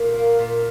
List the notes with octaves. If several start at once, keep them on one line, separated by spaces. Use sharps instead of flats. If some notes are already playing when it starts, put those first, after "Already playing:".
Already playing: A#2 D#4
A#3
A#2